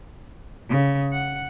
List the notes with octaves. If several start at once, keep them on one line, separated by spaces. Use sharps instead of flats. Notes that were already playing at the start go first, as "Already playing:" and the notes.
C#3
F#5